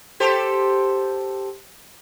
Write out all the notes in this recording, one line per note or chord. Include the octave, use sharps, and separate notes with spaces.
G4 A4 C5